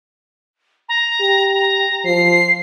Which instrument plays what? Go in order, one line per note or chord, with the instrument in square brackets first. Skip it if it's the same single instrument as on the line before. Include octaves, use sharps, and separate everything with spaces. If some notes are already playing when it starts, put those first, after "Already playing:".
[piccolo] A#5
[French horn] G4
[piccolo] A#5
[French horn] F3 [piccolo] C7